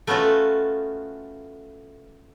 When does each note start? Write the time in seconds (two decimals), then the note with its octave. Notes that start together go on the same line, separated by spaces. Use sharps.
0.07 A3 B3 C#4 F4 F#4 A4